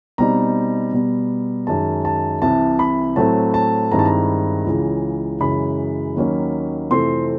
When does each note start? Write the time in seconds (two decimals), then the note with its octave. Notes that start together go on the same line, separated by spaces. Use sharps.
0.18 B2 G3 C4 D#4 A#5
0.92 B2 G3 B3
1.67 F#2 D#3 G#3 A5
2.05 A5
2.42 C2 C3 E3 A5
2.79 B5
3.16 A2 F#3 A3 C4 E4 A5
3.54 A5
3.92 G2 D#3 G#3 C4 E4 A#5
3.99 A5
4.05 A#5
4.65 C#2 C#3 E3 G#3
5.41 F#2 C#3 E3 G#3 B5
6.16 D#2 D#3 F#3 A#3 C#4
6.90 F2 C3 E3 A3 C4 C6